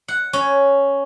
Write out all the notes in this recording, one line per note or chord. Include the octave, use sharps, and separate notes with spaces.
F#5
C#4